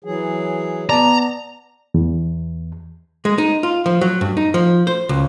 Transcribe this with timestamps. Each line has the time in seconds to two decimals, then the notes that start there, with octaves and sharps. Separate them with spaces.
0.04 E3 F#3 G#4
0.89 B3 D5 A5 A#5
1.94 E2
3.25 G#3
3.38 D#4
3.63 F4
3.86 F3
4.01 F#3
4.21 G2
4.37 D#4
4.54 F3
4.87 C5
5.09 C#2